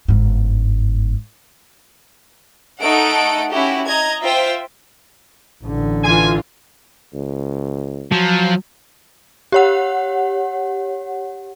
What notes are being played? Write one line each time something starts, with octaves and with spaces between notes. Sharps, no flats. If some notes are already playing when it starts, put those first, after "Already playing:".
G1 G#2
A3 D#4 A4 F#5 D7
C#4 E4 F#4 G4
D#5 A#5 G#6
F4 C5 E5 G5
A1 D3
E3 F4 G#5
C#2
F3 F#3
G4 C#5 F#5